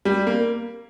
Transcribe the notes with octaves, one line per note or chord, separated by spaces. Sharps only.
G3
A#3